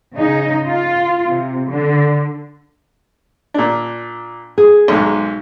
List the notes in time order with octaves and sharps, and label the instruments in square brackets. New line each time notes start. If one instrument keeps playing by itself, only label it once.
[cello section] C#3 D#4
F4
C3
D3
[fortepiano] A#2 D4
[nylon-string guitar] G#4
[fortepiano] B1 G#2